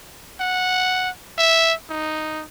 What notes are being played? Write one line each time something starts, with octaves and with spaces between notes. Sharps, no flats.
F#5
E5
D#4